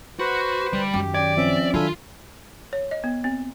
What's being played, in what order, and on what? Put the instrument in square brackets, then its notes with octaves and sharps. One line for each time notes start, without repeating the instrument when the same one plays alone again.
[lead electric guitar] F#4 [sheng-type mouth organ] B4 C5
[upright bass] D3 [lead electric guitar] G3
[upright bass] F#2 D#3 [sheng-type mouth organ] G4
[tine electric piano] C#4 G5 G#6 [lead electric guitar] D5
[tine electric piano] F3 C4 C#4 [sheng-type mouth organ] E5
[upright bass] D#3 [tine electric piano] F#3 D4 A4 [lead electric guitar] F4 [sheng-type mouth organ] E5 G#5 B5
[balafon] C#5
D#5
B3
C4